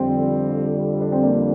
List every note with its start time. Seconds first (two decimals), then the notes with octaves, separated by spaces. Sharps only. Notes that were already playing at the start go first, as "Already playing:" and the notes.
Already playing: F2 D3 G3 C4
1.01 D4
1.12 C4
1.23 A#3 D4